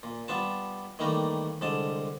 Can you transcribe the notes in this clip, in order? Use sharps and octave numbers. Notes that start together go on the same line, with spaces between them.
A#2
G3 B3 F4 A5
D#3 E3 G3 A3 A#3 A#4
C2 D3 G#3 A5